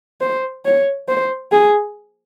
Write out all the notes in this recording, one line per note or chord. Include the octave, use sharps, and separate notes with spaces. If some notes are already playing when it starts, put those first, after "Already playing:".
C5
C#5
C5
G#4